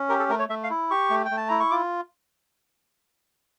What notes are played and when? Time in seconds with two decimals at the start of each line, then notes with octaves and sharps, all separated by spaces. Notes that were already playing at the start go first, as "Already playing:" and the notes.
Already playing: C#4
0.09 G4 A#4
0.19 A4
0.29 A3 A#4
0.39 C#5
0.49 A3 E5
0.64 F5
0.70 E4
0.91 G4 C#6
1.10 A3
1.25 G5
1.31 A3
1.37 A5
1.48 E4 A#5
1.60 C#6
1.71 F4 D6